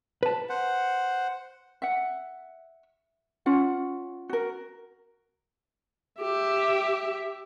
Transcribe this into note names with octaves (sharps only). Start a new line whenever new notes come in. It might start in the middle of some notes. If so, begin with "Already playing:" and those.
B4 A5
C5 F#5
E5 F#5
C#4 F4 F#5
F#4 A#4
G4 E5